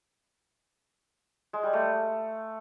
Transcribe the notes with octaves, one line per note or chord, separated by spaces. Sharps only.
G#3
G3
A3